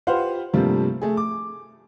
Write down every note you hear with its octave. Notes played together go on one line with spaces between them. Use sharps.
F4 G4 B4 C5 F5 F#5
G2 C3 F3 G3 A3 A#3
A3 G#4
D6